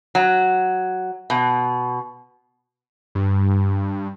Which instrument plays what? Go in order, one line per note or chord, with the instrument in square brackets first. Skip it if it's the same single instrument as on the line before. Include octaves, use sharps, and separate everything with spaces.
[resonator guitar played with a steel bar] F#3
B2
[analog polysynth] G2